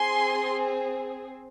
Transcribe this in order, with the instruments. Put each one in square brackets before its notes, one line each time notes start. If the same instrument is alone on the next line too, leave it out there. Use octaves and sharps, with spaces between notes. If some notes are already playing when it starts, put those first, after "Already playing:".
Already playing: [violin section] C4 G#4 G#5 C6